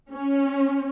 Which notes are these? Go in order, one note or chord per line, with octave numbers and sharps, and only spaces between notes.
C#4